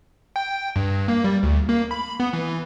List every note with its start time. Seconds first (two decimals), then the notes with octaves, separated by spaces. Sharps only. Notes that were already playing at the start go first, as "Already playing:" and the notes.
0.36 G5
0.76 G2
1.08 A#3
1.24 G3
1.43 D2
1.69 A#3
1.91 B5
2.20 B3
2.33 E3